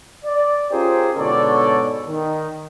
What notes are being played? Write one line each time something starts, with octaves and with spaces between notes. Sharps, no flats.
D5
C#4 F4 G4 G#4 A#4 C5
G#2 B2 D3 A4 C#5 D5
D#3